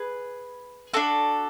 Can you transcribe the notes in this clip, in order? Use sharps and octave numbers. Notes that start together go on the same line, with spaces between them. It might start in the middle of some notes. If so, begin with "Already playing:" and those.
Already playing: G#4 B4
D4 F#4 A4